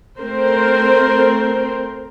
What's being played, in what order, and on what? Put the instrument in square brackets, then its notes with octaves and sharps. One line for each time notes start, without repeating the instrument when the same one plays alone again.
[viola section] A3 C4 A#4 C5